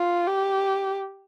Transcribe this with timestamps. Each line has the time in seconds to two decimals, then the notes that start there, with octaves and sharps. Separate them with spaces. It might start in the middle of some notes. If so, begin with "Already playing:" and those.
Already playing: F4
0.27 G4